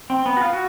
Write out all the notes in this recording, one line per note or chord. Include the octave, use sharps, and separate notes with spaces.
C4
B3
F#4
F4
F#4